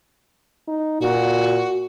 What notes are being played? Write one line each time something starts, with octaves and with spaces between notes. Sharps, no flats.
D#4
A#2 F#4